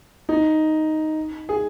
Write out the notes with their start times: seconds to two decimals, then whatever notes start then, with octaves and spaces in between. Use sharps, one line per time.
0.29 D#4
1.49 G#4